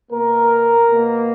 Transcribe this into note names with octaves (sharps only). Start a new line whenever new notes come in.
B2 A#3 A#4
B2 A#3